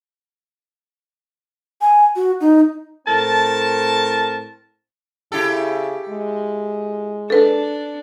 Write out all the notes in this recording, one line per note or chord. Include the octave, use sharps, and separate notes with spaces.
G#5
F#4
D#4
A2 C4 A#4 A5
C#3 E4 G4 A4
G#3
D4 A4 B4